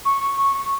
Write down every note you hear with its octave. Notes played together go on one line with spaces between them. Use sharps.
C#6